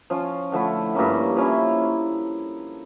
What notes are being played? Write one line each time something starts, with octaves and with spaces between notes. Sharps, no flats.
F3 C#4 F4
D3 F3 A3 E4
G2 F3 A#3 C#4
F3 C#4 E4